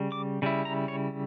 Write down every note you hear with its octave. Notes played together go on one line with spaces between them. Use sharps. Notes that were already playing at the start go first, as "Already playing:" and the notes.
Already playing: C#3 G3
D6
C#3 G3 E4
A#5
C#5